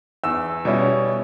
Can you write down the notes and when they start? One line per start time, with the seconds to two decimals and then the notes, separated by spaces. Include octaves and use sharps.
0.24 E2 E6
0.65 B2 G3 C#4 E4